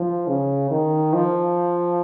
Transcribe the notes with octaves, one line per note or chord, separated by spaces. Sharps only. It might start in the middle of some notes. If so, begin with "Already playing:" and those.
Already playing: F3
C#3
D#3
F3